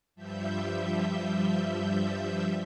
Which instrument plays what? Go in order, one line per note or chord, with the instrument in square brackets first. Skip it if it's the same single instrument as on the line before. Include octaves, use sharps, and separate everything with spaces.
[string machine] G2 F3 G3 E5 G6